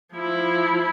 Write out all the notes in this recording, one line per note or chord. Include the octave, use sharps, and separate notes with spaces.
F3 E4